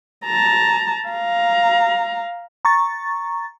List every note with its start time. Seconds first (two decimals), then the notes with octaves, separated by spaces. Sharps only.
0.25 A5 A#5
1.09 F5 A#5
2.65 A#5 C#6 A6